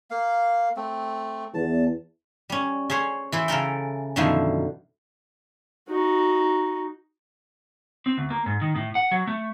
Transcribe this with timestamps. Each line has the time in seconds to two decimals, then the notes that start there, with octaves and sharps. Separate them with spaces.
0.11 A#3 F5
0.77 A3 C4
1.54 E2 A5
2.50 G3 C#4
2.90 C#4 G#4 C5 C#5
3.32 E3 E4 C5
3.48 C#3 A4 A#4 G5
4.16 F#2 B2 D3 D#3 F3 E4
5.88 D#4 F#4
8.06 C4
8.18 D2
8.30 A#3
8.46 G#2
8.62 D#3
8.76 A2
8.95 F#5
9.11 F#3
9.27 A3